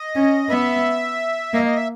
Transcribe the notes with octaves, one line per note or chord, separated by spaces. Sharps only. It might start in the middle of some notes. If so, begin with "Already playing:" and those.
Already playing: D#5
C#4
B3 E5
A#3 D#5
D#5
E5